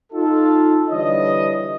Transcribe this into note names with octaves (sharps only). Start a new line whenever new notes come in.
D#4 F4 A4
D3 E3 G3 D4 C#5 D#5